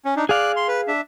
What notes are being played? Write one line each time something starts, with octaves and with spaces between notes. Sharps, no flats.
C#4
D4 D#4
G#4 D5 F5 F#6
C6
B4
D4 E5